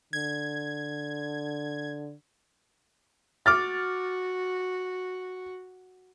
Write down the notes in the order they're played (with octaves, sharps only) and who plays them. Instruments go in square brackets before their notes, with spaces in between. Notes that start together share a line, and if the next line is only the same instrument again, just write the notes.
[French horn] D3 [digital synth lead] G#6
[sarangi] F#4 [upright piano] D6 F6 A6